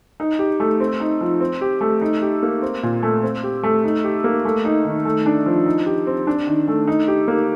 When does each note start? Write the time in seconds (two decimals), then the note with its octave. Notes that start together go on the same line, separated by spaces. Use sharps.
0.20 D#4
0.39 G4
0.60 A3
0.80 C4
1.00 D#4
1.21 F3
1.40 C4
1.61 G4
1.81 A3
2.01 D#4
2.22 G4
2.43 A#3
2.62 C4
2.83 A#2
3.03 A3
3.23 C4
3.43 G4
3.63 A3
3.84 D#4
4.04 G4
4.24 A#3
4.45 A3
4.65 D#4
4.85 D#3
5.05 A3
5.26 D4
5.46 F3
5.66 D#4
5.86 G4
6.07 C4
6.27 D4
6.47 D#3
6.68 A3
6.88 D#4
7.08 G4
7.28 A#3